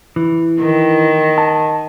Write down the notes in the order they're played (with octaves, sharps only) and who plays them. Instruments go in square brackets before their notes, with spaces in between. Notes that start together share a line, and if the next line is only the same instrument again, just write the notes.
[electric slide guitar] E3
[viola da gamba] D#3
[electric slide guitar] A5